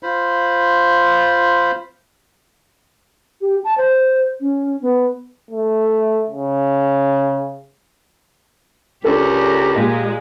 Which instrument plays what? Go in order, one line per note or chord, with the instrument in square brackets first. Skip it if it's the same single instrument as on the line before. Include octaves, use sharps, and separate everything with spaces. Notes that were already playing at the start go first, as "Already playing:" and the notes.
[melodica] F4 C5 B5
[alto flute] G4
A5
C5
C#4
B3
[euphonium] A3
C#3
[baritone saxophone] C#2 [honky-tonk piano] D4 A4 [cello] G4 A#4
[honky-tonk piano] A#2 [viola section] G#3